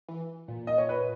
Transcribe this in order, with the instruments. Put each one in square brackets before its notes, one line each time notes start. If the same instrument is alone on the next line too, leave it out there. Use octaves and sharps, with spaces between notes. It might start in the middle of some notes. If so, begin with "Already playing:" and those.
[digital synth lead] E3
A#2
[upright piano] D#5
C#5
B4